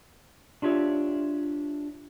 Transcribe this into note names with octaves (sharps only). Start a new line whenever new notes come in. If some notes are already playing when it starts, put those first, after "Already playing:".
D4 F4 G4 C#5 E5